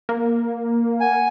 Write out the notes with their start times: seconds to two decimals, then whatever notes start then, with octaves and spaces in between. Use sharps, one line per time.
0.09 A#3
1.01 F#5 G#5